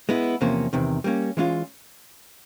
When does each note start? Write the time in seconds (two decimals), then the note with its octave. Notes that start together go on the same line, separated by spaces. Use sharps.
0.09 G#3 B3 E4
0.41 E2 C3 F3 A#3 C#4
0.73 E2 C3 D#3
1.04 G3 A#3 C#4
1.37 E3 G#3 C#4 F4